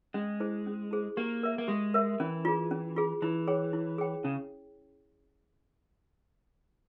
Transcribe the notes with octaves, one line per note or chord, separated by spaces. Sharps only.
G#3 C#4
E4 G#4 C5
C#4
E4 G#4 C5
A#3 G4
A#4 E5
A#3
G#3 G4
A#4 E5
E3 C#4
F4 G#4
C#4
F4 G#4
E3 E4
G#4 C#5 G5
E4
G#4 C#5 G5
C#3 C#4